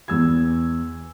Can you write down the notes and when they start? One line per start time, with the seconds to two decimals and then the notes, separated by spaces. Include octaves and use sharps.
0.08 E2 E6 G#6